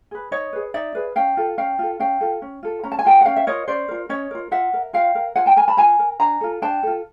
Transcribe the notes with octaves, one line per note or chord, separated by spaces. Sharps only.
G#4 B4
D#4 C#5 D#5
G#4 B4
D#4 D5 E5
G#4 B4
C#4 F5 G5
F4 A4
C#4 F5 G5
F4 A4
C#4 F5 G5
F4 A4
C#4
F4 A4
C#4 A#5
A5
G#5
F4 A#4 G5 A5
F#5
C#4 F5 G5
E5
F4 A#4 C#5 D#5
C#4 C5 D5
F4 A#4
C#4 C#5 D#5
F4 A#4
F4 E5 F#5
A#4
F4 F5 G5
A#4
F4 F#5 G#5
G5 A5
A#4 G#5 A#5
A5 B5
F4 G#5 A#5
A#4
D4 G#5 A#5
F4 A4
D4 G5 A5
F4 A4